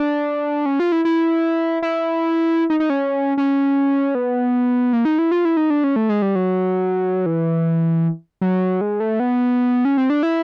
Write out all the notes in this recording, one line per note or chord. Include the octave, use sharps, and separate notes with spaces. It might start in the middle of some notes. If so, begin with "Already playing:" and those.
Already playing: D4
C#4
F4
E4
E4
E4
D#4
D#4
C#4
C#4
B3
A#3
D#4
E4
F4
E4
D#4
D4
C#4
A3
G#3
G3
F#3
E3
F#3
G#3
A3
B3
C#4
C4
D4
E4